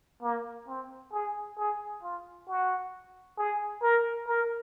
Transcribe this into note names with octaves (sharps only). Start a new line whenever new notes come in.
A#3
C4
G#4
G#4
F4
F#4
G#4
A#4
A#4